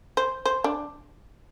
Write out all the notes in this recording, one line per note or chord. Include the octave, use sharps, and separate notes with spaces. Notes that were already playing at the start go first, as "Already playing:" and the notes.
C5
C5
D4